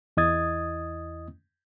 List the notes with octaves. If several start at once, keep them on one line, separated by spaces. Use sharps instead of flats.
E2 E4 D#5 D#6 G#6 A6